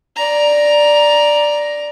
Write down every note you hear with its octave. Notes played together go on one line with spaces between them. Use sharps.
D5 A#5